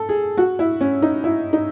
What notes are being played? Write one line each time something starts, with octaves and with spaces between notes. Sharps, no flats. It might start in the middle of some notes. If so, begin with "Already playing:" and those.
Already playing: A4
G#4
F#4
E4
C#4
D#4
E4
D#4